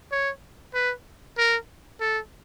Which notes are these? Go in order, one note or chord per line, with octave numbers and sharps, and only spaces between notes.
C#5
B4
A#4
A4